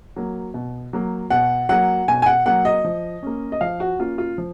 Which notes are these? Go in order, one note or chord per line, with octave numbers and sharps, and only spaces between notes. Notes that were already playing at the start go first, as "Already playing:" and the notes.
F#3 A#3
B2
F#3 A#3
B2 F#5
F#3 A#3 F#5
B2 G#5
G#5
F#5
F#3 A#3 F#5
D#5
F3
A#3 C#4
D#5
F3 F5
F#4
A#3 C#4 F4
F4
F3